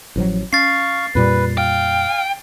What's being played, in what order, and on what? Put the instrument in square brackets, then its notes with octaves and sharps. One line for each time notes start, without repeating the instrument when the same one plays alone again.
[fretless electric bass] A1 F3 F#3
[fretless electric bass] C#4 [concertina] F5 C#6 [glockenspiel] A6 C7
[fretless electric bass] F2 A#2 G3 [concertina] B4
[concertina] F5 [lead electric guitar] G5